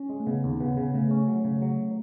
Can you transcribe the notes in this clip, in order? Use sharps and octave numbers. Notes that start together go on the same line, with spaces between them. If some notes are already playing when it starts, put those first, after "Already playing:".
Already playing: C#4
G#3
A3
C#3 B3
D#2
C#3 B3
C#3
C#3 A3
C#4
F#3
C#3
F#3